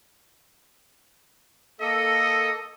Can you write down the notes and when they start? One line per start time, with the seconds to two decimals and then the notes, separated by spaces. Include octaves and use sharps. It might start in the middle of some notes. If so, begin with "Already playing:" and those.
1.80 A#3 A4 D#5